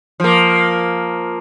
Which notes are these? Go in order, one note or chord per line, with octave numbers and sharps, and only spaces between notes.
F3 A#3